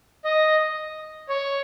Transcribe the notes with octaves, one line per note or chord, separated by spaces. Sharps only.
D#5
C#5